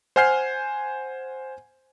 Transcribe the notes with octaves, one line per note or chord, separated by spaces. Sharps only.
C5 F#5 G#5 F6 G6 C7